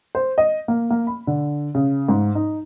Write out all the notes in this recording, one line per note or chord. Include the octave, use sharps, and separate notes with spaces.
C5
D#5
A#3
A#3
B5
D3
C#3
G#2
D#4